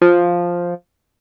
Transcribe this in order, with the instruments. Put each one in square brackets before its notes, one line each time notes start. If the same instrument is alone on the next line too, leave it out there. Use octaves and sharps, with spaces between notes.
[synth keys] F3